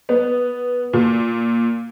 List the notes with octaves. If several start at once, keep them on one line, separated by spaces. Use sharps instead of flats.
B3
A#2